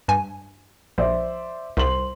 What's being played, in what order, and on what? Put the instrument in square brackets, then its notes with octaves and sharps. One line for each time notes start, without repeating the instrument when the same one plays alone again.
[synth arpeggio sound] G2 G#5
[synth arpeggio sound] A#1 [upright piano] C5 D5 E5
[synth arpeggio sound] C2 [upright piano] C5 C6 F#7